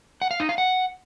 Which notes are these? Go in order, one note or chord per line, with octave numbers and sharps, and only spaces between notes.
F#5
F5
D#4
F5
F#5